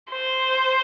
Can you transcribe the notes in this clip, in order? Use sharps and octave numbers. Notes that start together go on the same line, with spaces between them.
C5